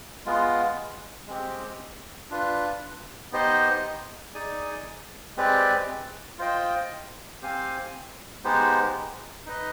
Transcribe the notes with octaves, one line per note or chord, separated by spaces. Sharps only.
G#3 B3 F4
G#3 C4 G4
D4 F4 B4
B3 D#4 G4 C5 D#5
D#4 G#4 D5 G#5
G#3 C4 G4 B4 D5
F4 C5 D#5 G5
C4 G4 C5 F5 G#5
G#3 B3 D#4 G4 C5
D#4 B4 D#5